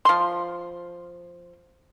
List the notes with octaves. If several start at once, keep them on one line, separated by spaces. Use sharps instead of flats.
F3 C6